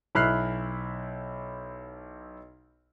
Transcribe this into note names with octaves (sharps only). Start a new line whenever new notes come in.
B1 E4 B5 F6 F#6 C7